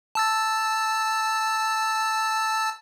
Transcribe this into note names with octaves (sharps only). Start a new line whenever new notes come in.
A5 E6 A6